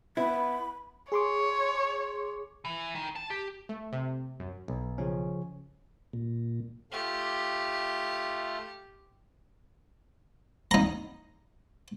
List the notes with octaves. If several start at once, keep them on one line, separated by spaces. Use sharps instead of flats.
B3 E4 B5
G#4 C#5 C6 D6
E3
D#3
A5
G4
A3
C3
F#2
B1
C#3 F3 C#4
A#2
A3 F4 G4
D#4 A#5